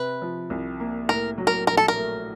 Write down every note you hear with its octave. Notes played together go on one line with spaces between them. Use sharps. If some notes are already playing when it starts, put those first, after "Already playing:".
Already playing: C3 B4
F3
C2
A#3
A2 A#4
F#3
A#4
A#1 A#4
A4
A#4
A3